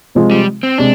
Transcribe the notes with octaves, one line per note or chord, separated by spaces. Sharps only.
C3 F3 G#3 C4 F4
G3
C4
C3 G#3 D4